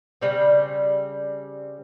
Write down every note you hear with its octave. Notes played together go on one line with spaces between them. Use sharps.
C#3 G3 C4